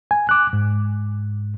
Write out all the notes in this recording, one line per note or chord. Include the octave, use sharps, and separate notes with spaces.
G#5
D6 F#6
G#2